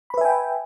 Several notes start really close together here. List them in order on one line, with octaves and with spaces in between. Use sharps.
B5 B4 E5 G#5 G5